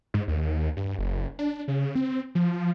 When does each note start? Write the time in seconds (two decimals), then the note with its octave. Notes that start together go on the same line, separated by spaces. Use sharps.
0.14 G#2
0.28 D#2
0.77 G2
0.99 F#1
1.39 D4
1.68 C#3
1.95 C4
2.35 F3